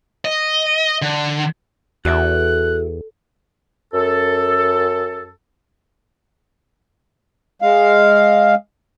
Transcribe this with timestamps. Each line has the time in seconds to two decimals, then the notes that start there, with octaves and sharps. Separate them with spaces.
0.25 D#5
1.02 D3
2.05 E2 F#4 A4 D5 E5 F#6
3.94 F#2 A4
7.62 G#3 F5